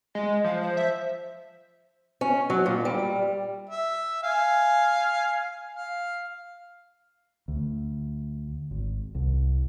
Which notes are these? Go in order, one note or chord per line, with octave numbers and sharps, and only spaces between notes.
G#3 D#5
F3 F5
C5
E5
C#4
F#3
A#2
G3
E5
F5 G#5
F5
D2
G#1
C2